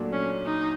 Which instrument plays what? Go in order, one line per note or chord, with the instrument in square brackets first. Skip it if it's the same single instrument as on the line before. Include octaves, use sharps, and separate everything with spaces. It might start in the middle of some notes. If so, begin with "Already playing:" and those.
Already playing: [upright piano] A#2 F#3 A3 D4
[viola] C#4
D#4